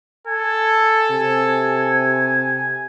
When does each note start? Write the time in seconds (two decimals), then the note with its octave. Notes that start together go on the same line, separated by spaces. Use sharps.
0.27 A4 G#5
1.11 C3